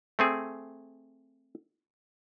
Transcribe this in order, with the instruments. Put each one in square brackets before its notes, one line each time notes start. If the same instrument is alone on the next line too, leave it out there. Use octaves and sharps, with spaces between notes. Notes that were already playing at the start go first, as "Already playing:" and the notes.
[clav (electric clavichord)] A3 C4 G#4